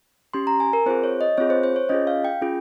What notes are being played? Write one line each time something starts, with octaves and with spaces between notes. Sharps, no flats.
C#4 G4 C6
A#5
G#5
A#4
C4 F4 G#4 C5
C#5
D#5
C4 F4 G#4 C#5
C5
C5
C#5
C#4 F4 G#4 D#5
F5
G5
C#4 F4 G#4